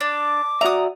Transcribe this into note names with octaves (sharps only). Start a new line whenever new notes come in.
D4 D6
F#4 D5 E5 A#5 D#6